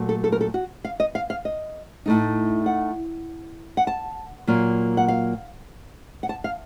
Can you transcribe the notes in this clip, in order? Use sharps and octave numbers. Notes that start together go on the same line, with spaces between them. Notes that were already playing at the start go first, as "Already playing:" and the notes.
Already playing: A#2 F#3 A3
A4
A4
A#4
A4
F#4
F5
D#5
F5
F5
D#5
A2 A3 D#4
F#5
F#5
A5
A#2 F#3 A#3 F4
F#5
F5
F#5
A5
F5